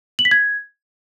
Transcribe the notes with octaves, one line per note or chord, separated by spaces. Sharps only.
F#7
B6
G#6